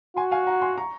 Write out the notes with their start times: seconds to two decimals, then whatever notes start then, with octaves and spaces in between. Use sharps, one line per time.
0.17 F#4 G#5 C6
0.31 F5 G#5
0.47 F#5 A#5
0.62 G#5 C6
0.78 A#5 C#6